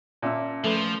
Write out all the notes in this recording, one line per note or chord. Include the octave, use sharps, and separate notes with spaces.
A#2 C#4 E5 A5 E6
F3 A3 A4 B4